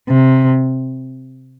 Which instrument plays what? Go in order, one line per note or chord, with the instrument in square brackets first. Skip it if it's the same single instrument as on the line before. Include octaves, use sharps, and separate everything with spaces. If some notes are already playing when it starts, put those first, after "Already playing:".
[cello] C3